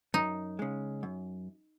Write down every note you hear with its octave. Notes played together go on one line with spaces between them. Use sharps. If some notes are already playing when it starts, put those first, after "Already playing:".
F#2 D#4
C#3 G#3
F#2